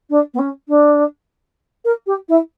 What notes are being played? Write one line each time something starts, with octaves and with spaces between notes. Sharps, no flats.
D4
B3
C#4
D4
A#4
G4
E4